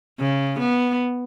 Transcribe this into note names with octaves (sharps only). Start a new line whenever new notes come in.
C#3
B3